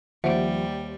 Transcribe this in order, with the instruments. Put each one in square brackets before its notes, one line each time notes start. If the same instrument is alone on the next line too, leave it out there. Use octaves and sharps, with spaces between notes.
[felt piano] D#2 [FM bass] F3 [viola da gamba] G3 [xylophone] C5 E5 F#5